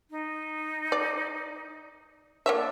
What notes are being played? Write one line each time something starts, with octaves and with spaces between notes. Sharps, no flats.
D#4
D5
A#3 D4 C#5 E5